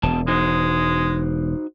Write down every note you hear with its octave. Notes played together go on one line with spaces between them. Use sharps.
E1 E2 B2 A5
G#3 D#4 F#4 C5